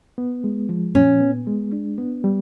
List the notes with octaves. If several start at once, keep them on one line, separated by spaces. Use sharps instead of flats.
B3
G#3
F3
A#2 C#4
B3
G#3
D4
B3
G3